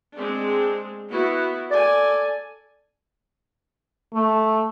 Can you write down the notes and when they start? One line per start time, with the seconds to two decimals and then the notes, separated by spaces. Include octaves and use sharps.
0.16 G#3 C4 D4
1.10 B3 E4 F#4
1.71 A4 D5 G#5
4.14 A3